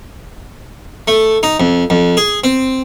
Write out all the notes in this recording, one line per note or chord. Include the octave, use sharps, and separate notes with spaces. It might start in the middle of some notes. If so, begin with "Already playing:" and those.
A3
D#4
F2
F2
G#4
C4